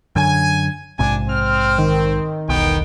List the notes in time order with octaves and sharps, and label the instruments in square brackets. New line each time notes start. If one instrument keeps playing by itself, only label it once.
[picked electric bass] F#2 D3 [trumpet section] G#5
[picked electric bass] A#1 G#2 C3 [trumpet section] D4 G#5
[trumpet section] C4 [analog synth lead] F6
[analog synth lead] D#3
[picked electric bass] E1 B1 [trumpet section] B3 D#4 G5